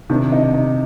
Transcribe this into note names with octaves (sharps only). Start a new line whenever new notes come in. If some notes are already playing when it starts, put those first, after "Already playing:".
C3 D#3 D4
D#4
D#4